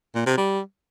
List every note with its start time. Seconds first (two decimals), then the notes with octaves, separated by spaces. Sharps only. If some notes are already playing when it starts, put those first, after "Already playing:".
0.15 A#2
0.26 C3
0.37 G3